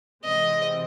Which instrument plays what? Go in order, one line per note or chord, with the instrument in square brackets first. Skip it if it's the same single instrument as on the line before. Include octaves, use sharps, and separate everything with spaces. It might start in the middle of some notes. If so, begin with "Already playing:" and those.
[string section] C3 E3 G#3 C4 [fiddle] D#5